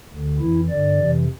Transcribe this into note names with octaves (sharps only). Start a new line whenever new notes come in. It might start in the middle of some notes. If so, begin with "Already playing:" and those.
D2 D3
F2 E3 E4
G2 D3 D5
F2 C3 E3